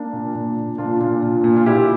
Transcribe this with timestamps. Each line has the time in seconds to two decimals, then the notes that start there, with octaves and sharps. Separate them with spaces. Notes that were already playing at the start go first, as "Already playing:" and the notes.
Already playing: A#3 D4
0.13 A#2
0.35 A#2
0.57 A#2
0.78 A#2 D4 F4
1.00 A#2 D4 F4
1.22 A#2
1.44 A#2
1.56 F4
1.66 A#2 E4 G4